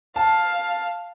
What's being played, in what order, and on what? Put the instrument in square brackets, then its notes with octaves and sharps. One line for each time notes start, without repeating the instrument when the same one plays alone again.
[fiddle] F5 [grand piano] A5